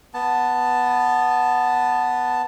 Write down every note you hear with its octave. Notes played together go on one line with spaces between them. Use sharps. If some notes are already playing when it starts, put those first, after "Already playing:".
B3 A5